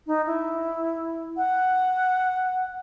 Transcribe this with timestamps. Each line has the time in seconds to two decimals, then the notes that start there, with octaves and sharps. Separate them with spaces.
0.07 D#4
0.26 E4
1.37 F#5